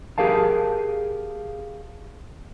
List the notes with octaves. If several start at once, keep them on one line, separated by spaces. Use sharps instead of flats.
G4 G#4 A#4 F5 A5